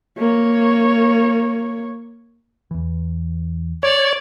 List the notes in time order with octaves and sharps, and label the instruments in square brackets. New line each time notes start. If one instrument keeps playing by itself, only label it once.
[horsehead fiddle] A#3 C#5
[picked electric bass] E2 E3
[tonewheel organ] C#5 [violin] D5